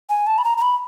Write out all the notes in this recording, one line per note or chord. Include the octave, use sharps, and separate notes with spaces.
G#5
A5
B5
A#5
A#5
B5